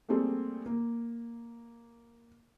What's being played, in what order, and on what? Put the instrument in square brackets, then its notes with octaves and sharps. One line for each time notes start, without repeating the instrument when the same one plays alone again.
[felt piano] G3 A3 A#3 C4 G#4 A4
A#3